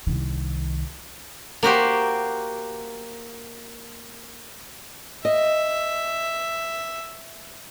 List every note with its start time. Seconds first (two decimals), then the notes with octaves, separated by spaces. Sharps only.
0.07 C2 D#3
1.63 A#3 F#4 G4 C5
5.25 D#5 E5